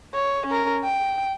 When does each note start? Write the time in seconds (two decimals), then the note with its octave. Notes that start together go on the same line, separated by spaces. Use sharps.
0.14 C#5
0.47 C#4 A#4
0.84 G5